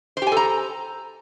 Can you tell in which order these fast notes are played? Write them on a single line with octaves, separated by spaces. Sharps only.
C5 G4 G#5 A4 A#5